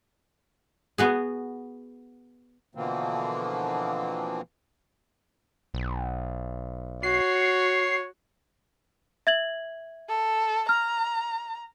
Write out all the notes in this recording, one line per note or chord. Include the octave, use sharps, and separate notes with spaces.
B3 F#4 G#4
B2 D3 E3 F3 A#3 C4
B1
F#4 C#5 C7
E5 G#6 F#7
A4
A#5 F6